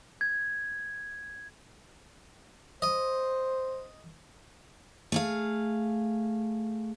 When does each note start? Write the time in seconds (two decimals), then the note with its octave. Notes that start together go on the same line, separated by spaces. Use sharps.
0.21 G#6
2.82 C5 D#5
5.12 A3 G#4 F5